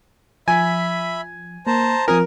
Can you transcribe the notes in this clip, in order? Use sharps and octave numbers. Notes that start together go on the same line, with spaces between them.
F3 E5 G#5 B5
A#3 A#4 C5 A5 A#5
F3 C4 F4 A#4 G#5 D#6